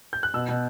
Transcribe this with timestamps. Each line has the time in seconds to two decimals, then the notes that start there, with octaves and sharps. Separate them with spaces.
0.13 G6
0.23 F#6
0.34 B2 E6
0.48 B2